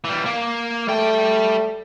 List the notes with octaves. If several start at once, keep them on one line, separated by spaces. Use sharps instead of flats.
E3 G3
A#3
G3 A3 G5